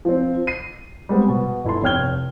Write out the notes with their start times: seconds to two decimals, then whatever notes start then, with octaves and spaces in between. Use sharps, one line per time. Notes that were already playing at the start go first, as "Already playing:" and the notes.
0.05 F3 C4
0.47 C7 D#7
1.09 G3 G#3 B3 C4
1.28 B2 B3
1.65 G1 E4 A4 C6
1.83 F1 C#5 G5 F6 G#6 G7